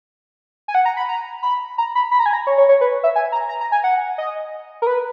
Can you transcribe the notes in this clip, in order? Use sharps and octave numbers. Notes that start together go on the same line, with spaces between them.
G#5
F#5
A#5
B5
A#5
B5
A#5
B5
B5
A#5
G#5
A#5
C#5
C#5
C#5
B4
E5
G#5
A#5
A#5
A#5
G#5
F#5
D#5
A#4
B4